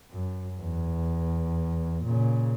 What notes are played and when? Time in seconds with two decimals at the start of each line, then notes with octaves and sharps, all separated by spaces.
0.11 F#2
0.61 E2
2.04 A#2 C#3